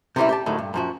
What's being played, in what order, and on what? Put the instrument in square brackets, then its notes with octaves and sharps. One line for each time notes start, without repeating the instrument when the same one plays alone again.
[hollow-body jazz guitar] C3 E3 G3 C#4 E4
G4 D5 A5
D2 A2 D#3 F#3
G2
F#2 F3 F#4